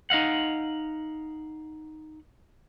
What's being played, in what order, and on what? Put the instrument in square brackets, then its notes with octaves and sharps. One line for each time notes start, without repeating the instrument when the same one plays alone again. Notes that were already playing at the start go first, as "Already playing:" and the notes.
[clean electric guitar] D#4 D#5 F5 F#5